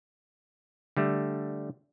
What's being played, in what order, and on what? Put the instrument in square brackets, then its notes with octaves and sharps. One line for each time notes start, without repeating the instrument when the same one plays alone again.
[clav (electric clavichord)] D3 G3 A3